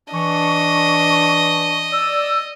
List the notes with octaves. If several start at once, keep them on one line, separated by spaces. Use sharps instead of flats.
E3 D4 D#5 C#6
D5 E6